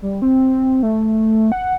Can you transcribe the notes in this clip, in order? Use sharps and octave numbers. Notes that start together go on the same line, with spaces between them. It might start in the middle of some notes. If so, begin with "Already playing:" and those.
G3
C4
A3
F#5